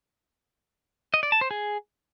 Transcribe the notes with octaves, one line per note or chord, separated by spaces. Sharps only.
D#5
D5
A5
C5
G#4